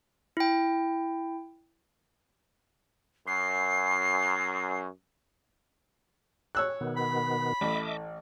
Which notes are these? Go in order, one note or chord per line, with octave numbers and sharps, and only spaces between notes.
E4 G5
F#2 C7
C#5 E6 F#6
B2 D#3 B3
B5
A1 D#5 E5 D6